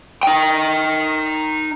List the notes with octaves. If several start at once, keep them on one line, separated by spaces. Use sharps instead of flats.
D#4 G5